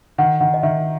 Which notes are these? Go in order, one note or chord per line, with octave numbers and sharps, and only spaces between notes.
D#3 F#5
D#3 F#5
D#5
D#3 E5